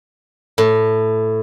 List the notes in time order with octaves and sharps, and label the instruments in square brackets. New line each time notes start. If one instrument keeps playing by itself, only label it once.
[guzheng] A2